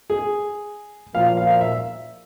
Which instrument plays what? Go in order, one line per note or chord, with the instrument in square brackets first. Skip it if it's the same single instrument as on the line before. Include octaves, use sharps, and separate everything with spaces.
[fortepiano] G#4
[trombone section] A#2 F3 A#3 F4 [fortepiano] F5
[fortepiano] F5
F5
E5